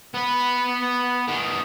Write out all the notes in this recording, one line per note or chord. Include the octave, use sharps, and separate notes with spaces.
B3 B4
D#3 B3